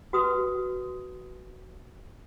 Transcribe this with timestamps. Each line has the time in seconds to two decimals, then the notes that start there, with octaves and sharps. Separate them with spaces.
0.13 F#4 B4 D#6